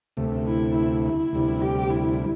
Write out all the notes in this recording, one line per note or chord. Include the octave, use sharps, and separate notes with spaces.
D2 C3 A3
E4
E4
E4
D2 C3 G3
G4
E4